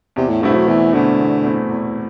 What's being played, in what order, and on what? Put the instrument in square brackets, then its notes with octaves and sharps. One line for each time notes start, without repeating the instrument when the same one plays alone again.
[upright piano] E2 [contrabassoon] C3
[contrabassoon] A2
[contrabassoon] G2 [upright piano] B2 A3 C4 E4
[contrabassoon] F#3
[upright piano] E2 [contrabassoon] E3
[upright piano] B2 A3 C4 E4 [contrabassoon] D3
[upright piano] E2
B2 A3 C4 E4
E2